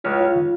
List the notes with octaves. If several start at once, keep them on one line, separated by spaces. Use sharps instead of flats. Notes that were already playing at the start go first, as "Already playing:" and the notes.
C#2 C#3 F4
F4
D#3